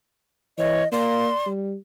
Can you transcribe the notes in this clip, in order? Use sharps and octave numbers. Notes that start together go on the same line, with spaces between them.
E3 C#5 D#5
A#3 D5 C6
G3